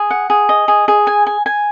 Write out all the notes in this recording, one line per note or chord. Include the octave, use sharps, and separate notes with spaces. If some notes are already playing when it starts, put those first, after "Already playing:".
Already playing: G#4
F#5
G#4
D#5
G#4
G#4
G#5
G#5
G#5